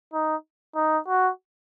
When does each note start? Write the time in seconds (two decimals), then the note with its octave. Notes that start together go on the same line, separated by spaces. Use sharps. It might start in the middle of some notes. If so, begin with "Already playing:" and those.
0.13 D#4
0.76 D#4
1.08 F#4